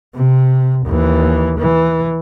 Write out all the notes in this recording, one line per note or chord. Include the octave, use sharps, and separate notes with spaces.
C3
D#2 E3
E3